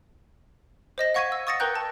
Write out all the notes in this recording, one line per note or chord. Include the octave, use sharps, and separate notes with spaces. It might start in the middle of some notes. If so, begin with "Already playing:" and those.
C5 D#5 A#6
F5 F#5 C#6 G#6 B6 D#7
E6
C#6 D#6 A6 A#6 C#7
A#4 B4 G5 A#5 F#6 G6
A5